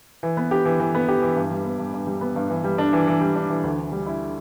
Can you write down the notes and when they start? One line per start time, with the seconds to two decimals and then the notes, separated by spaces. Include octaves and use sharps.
0.23 E3
0.37 B3
0.51 G4
0.66 E3
0.80 E3
0.95 B3
1.08 G4
1.22 E3
1.36 G2
1.51 G3
1.65 B3
1.79 G2
1.94 G2
2.07 G3
2.21 B3
2.36 G2
2.50 E3
2.64 G3
2.78 D4
2.93 E3
3.07 E3
3.21 G3
3.35 D4
3.50 E3
3.64 D2
3.78 D3
3.92 G3
4.06 E4